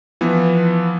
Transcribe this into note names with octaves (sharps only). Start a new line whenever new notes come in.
E3 F3 B3